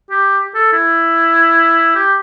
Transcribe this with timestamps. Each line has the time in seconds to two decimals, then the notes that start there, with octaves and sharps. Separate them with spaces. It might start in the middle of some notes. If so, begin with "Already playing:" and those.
0.11 G4
0.55 A4
0.73 E4
1.95 G4